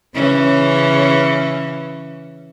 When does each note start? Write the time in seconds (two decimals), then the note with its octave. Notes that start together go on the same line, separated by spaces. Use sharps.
0.15 C#3 E3 C#4